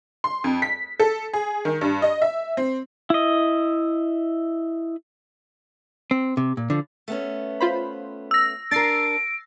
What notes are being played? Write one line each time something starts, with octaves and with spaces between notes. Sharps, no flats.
C6
F2
B6
A4
G#4
D#3
G2
D#5
E5
C4
E4 D#5
C4
C3
A#2
D3 F3
A3 B3 C#4
F4 C5 B5
E6 A#6
D4 A#4 A6 C7 D7